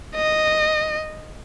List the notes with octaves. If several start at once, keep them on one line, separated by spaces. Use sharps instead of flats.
D#5